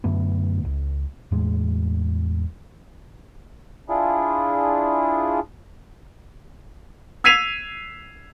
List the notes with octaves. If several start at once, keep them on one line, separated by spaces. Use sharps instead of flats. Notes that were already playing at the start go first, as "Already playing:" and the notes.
F#2 D3 A3 B3
D#1 C#2
E2 A2 G#3
D4 E4 F4 G#4
E6 G#6 B6 C7 D#7 F7